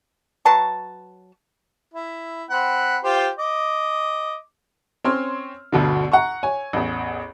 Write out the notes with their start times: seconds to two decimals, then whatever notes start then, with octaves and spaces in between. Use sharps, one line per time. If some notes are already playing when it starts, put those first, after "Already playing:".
0.45 F#3 B4 A5 C#6
1.94 E4
2.50 C4 F#5 B5
3.04 F4 G4 C5
3.39 D#5 D6
5.04 C4 C#4 C#5 C6 F6
5.72 G1 D2 B2 D3
6.12 F#5 A#5 C#6
6.43 C#5 G#5
6.73 A1 E2